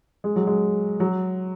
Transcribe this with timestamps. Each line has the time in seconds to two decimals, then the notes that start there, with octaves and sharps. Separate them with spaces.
0.24 G#3
0.36 F#3
0.47 G#3
1.00 F#3